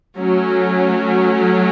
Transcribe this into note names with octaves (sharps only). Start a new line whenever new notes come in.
F#3 A3 C#4